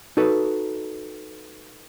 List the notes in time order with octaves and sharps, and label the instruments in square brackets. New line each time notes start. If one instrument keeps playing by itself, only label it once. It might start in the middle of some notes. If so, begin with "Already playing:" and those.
[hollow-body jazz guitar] D#4 F#4 A4 B4